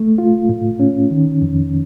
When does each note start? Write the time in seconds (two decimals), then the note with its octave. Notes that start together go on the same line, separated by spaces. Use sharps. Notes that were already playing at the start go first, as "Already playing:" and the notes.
Already playing: A3
0.18 F4
0.49 A2
0.80 C#4
1.11 D#3
1.42 F2